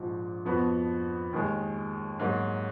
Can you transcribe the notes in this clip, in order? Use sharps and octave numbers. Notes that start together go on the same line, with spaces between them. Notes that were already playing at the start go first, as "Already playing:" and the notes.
Already playing: A#1 G#2 F3
F2 F3 B3 F#4
D#2 D#3 G#3
G#2 F#3 A#3